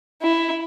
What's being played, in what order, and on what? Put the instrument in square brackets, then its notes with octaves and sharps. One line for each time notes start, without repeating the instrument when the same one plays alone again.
[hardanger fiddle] E4